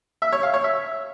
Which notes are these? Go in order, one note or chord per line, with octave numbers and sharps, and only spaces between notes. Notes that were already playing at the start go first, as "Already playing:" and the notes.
E5
C#5
F5
C#5
E5